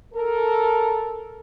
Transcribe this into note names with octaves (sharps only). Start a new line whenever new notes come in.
A4 A#4